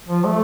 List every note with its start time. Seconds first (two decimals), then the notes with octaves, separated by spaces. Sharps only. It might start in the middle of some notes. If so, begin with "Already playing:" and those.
0.09 F3
0.25 A3